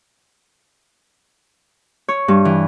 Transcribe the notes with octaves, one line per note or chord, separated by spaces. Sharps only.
C#5
G2
E3